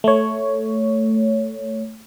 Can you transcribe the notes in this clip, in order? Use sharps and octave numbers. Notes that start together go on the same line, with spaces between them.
A3 C#5